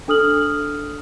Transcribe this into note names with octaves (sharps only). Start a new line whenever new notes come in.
D4 A4 D#6 F6 F#7